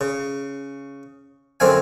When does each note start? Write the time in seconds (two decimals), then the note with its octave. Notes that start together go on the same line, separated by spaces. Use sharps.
0.01 C#3
1.60 F#2 D3 C4 F5 G#5